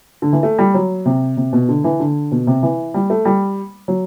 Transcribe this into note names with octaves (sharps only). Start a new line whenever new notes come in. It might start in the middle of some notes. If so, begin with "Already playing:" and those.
D3
E3
A3
G3
F#3
C3
C3
B2
D3
E3
D3
B2
C3
E3
G3
A3
G3
F#3